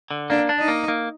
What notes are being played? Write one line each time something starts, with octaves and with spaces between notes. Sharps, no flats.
D3
A#3 D4
D4
D#4
A#3
A#3